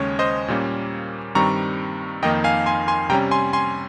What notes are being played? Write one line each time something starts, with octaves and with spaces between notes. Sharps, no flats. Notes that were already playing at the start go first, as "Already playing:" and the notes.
Already playing: D#2 C#3 G#3 C#4 C#5
C5 D#5
A#2 G3 A#3 C#4
G2 D#3 G3 C4 A#5 C#6
F2 D#3 A#3 D#4 D#5 G5
F5 G#5
G#5 C6
G#5 C6
C3 G3 C#4 G5 A#5
G#5 C6
G#5 C6